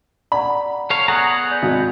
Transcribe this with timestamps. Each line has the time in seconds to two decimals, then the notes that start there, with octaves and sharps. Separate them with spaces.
0.32 D5 F#5 A#5 B5
0.90 A4 C#5 F5
1.08 B3 G#4 F#5 A#5 C#6 D#6 G#6
1.51 D5 G6
1.63 G#1